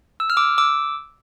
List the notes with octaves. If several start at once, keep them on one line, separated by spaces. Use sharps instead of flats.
E6
F6
D6 E6
D6 E6